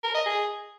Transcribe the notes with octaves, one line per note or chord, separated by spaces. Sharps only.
A#4
D#5
G#4